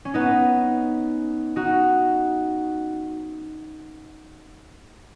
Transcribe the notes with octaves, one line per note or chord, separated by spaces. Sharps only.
C#4
B3 D#4
D#4 F#4